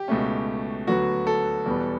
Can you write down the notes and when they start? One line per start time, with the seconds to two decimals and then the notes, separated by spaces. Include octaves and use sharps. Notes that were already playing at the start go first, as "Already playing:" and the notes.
Already playing: G4
0.08 C#2 B2 A3 C#4
0.87 D2 D3 F#3 B3 F#4
1.27 A4
1.65 E2 B2 G3 B3